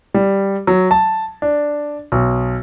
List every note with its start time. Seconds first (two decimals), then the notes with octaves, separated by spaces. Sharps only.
0.14 G3
0.67 F#3
0.91 A5
1.42 D4
2.12 B1